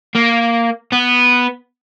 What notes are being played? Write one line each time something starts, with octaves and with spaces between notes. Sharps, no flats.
A#3
B3